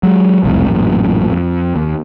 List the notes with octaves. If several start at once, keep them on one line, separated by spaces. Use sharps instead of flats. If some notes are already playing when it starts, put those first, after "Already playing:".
F#3 G#3
E1 C2 F2 A2
A1 F#2 A#2
F2
D#2